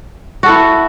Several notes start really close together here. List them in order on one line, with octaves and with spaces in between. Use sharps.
F#4 A4 E4